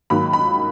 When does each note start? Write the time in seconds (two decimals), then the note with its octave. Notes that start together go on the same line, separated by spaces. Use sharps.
0.10 G#2 D#3 F#3 A#3 B5
0.33 B5